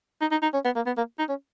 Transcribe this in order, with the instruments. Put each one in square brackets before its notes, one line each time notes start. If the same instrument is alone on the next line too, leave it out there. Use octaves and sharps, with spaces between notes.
[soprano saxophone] D#4
D#4
D#4
C#4
B3
A#3
B3
A#3
D#4
C#4